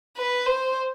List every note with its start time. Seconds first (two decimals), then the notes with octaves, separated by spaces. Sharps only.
0.18 B4
0.46 C5